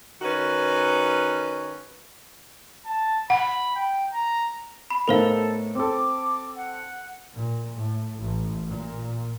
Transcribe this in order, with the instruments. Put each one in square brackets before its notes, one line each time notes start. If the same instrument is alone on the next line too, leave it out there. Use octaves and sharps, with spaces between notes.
[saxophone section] D#3 C#4 F#4 B4
[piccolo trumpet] A5
[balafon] F#5 [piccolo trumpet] B5
[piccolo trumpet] G5
A#5
[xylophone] B5
[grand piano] A2 B3 D#4 [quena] A4 [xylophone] A#4 C5 F5
[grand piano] C4 A4 [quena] D6
[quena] F#5
[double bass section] A#2
A2
A1
A#2